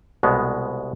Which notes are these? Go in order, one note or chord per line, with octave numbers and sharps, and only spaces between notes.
C2 B2 G#3 B3